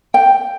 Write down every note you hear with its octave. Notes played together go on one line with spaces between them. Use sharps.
G5